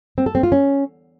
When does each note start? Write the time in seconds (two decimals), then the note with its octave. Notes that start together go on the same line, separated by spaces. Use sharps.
0.18 C4
0.26 A4
0.35 C4
0.43 F4
0.52 C#4